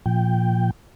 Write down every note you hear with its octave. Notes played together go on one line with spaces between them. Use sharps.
A#2 F3 G5